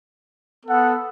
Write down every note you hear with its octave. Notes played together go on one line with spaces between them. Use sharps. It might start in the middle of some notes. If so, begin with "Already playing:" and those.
B3 A4 F#5